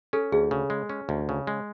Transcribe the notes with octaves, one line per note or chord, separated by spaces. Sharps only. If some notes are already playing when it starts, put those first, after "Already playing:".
C#4 A4
D2 G#4
C#3
G#3
C#4
D2
C#3
G#3